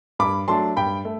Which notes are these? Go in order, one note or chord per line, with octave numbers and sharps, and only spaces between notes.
G2 B5 D6
F#3 A3 D4 A5 C6
G2 G5 B5
A3